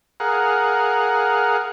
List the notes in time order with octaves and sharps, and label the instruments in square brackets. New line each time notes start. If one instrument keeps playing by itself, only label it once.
[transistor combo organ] G#4 A#4 F5 F#5